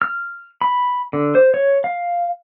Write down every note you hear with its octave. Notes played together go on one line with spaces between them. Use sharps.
F6
B5
D3
C5
C#5
F5